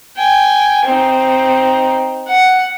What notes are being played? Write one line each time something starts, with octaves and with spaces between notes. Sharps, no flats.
G5 G#5
C4 D#4
F#5